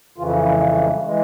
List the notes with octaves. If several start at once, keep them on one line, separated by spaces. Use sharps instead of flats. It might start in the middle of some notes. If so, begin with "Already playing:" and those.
F2 C#3 E3 F4
E4
C#4
G#3
G3
G3
G#3
G3
E3 G#3